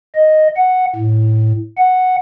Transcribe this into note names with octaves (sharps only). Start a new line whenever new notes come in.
D#5
F#5
A2
F#5